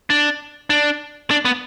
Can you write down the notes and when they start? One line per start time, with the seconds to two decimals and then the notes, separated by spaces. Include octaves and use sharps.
0.10 D4
0.70 D4
1.31 D4
1.45 B3